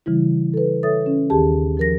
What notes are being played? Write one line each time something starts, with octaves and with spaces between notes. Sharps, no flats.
C#3 E3 G3 E4
A4 B4
A4 C#5 E5 D#6 A6
C#4
D#2 D#3 G4 G#4 A5
F3 A#4 A#6